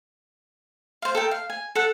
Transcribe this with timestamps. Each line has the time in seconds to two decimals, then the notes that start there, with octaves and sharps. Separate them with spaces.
1.02 C5 F5
1.15 A4 A#4 G5
1.31 F5
1.50 G#5
1.75 A4 F#5